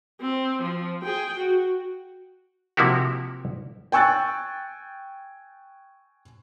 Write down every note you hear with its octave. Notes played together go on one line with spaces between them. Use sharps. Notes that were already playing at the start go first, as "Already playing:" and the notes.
C4
F3
G#4 G5
F#4
C3 F3 A#3 E4 F#4 G4
G5 G#5 C#6 E6 F#6 A6